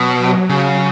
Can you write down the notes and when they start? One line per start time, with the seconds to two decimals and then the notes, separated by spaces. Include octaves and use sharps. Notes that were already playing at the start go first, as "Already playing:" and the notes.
Already playing: B2 F#3
0.18 F#3
0.49 C#3 F#3